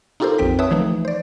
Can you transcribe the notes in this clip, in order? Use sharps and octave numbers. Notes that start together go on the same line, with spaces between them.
D#4 F4 G4 A4 A#4 C5
A#1 F2 C4 G5 B6
B4 C#5 E5 A5 D#6 E6
E3 F3 A3 D#4
C5 D5